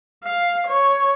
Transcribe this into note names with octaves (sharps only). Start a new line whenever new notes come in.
F5
C#5